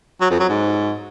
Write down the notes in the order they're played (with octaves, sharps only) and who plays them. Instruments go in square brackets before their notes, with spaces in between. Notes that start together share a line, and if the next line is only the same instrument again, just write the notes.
[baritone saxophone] F#3
F2
F#3
G#2